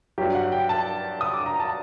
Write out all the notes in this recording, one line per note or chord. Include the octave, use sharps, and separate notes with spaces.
G2 F#3 G4
F#5
G5
A5
D#6
D6
A#5
A5